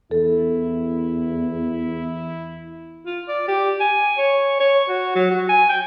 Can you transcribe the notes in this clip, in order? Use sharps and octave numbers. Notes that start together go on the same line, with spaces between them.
E2 E4 A4
F4
D5
G4
G#5
C#5
C#5
F#4
F#3
F#4
G#5
G5